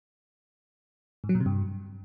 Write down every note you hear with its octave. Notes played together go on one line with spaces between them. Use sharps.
G#2
F#3
A#2
C3
G2